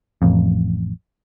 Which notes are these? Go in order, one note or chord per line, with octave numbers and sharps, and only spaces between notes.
A1 F2